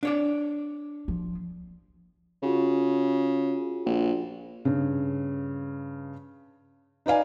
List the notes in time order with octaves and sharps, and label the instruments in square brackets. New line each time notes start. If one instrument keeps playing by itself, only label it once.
[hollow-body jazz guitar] D4 C#5 D5
[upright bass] F3
[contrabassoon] C#3 [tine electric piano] F4 F#4 G#4
[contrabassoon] A#1
[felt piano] G2 C#3
D#4 B4 D5 F5 G#5